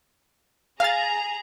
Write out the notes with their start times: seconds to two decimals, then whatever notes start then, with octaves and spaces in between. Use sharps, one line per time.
0.80 G#4 F5 A#5 A6